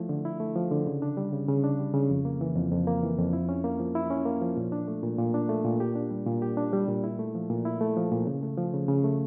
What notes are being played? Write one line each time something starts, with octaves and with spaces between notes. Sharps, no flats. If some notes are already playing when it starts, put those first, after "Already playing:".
Already playing: F3 A3 E4
D3
E4
A3
F3
D3
C#3
D4
G3
C#3
C#3
D4
G3
C#3
F2
A#3
E3
F2
F2
A#3
E3
F2
E4
C#4
A#3
F3
E4
C#4
A#3
F3
A#2
D4
A3
A#2
A#2
D4
A3
A#2
G4
D4
G3
A#2
G4
D4
G3
A#2
E4
A3
F3
A#2
E4
A3
F3
A#2
C#3
A3
F3
C#3
C#3
A3